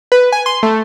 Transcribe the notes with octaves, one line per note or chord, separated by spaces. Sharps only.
B4
G#5
C6
A3